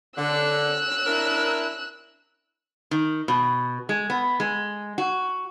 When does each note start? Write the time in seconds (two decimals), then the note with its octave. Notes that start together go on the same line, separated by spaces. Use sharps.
0.18 D3 E6 F#6
1.06 D4 E4 A#4
2.91 D#3
3.28 B2
3.89 G#3
4.10 B3
4.40 G#3
4.98 F#4